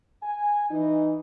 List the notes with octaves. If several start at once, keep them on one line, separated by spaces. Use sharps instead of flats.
G#5
E3 D#4